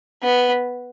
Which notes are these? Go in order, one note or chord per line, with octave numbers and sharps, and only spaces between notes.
B3